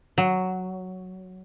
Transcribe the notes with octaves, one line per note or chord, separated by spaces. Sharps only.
F#3